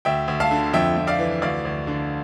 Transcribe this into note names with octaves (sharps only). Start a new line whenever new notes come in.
D2 E5 G5
D2
F5 A5
D3
F2 E5 G5
F2
D5 F5
E3
D2 D5 F5
D2
D3